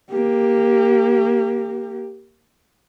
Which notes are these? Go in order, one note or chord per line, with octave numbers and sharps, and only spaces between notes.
A#3 G4